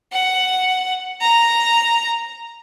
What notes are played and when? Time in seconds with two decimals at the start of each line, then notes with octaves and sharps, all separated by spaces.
0.12 F#5
1.21 A#5